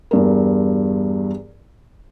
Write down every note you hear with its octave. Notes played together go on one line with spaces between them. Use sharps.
E2 G2 A#4